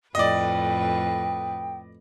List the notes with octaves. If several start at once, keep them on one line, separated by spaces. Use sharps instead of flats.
F2 A2 B4 D5 D#5 G5